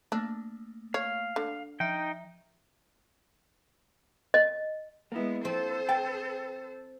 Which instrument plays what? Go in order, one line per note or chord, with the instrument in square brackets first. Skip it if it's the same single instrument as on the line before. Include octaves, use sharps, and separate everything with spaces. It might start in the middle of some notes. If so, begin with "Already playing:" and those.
[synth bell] A3 A#3 [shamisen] D4
[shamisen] C#5 [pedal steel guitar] F5
[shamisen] D3
[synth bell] F3 E5 [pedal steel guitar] D#4 G5
[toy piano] D#5
[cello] G#3 B3 [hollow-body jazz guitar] A#3 E4
[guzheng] F3 C4 [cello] A4 C5
[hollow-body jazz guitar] G5 [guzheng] A5